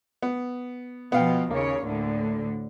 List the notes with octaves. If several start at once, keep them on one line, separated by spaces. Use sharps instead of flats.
B3
B2 F3 B3 F5 G5
D#2 C#3 A#3 C#5
D2 A2 D3